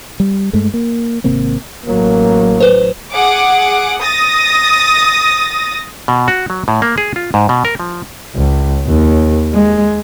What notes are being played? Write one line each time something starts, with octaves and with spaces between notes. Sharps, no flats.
G3
G2 G#3 A3
A#3
G#1 C3 A#3 C4
A1 F#3 A#3
B4 C5
G#4 F#5 D6
D#6 A6 A#6
B2
F#4
F#3
A2
A#3
G#4
F4
G#2
B2
A#4
F3
C#2
D#2
G#3